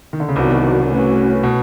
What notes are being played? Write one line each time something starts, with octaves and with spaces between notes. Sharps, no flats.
D#3
D3
C#3
C2 C3 D#3 F#3 B3 D4 F#4
A3 C#4 F#4 B4
B2